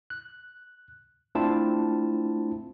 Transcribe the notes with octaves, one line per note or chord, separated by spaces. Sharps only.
F#6
A3 C4 D4 E4 F4 A5